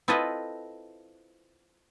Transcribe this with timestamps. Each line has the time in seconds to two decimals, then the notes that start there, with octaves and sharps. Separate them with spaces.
0.08 C4 E4 F4 A4 B4 D#5